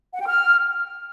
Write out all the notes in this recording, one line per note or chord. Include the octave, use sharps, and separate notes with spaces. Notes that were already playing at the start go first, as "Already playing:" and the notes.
F#5
G5
F6